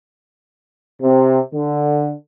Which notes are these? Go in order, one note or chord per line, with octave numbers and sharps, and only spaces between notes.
C3
D3